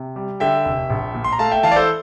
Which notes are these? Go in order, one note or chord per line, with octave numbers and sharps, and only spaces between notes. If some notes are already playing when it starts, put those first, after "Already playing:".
Already playing: C3
G3
D3 E5 G5
F1
A#1
A#2
C6
A#5
A3 F5 A5
E5 G5
E3 F5 A5
D5
A4 C5